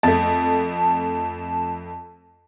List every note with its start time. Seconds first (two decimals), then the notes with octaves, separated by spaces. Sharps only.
0.03 F2 A3 A5